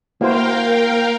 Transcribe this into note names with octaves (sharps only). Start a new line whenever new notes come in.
A#3 E4 F#4 A#4 C5 F5 G5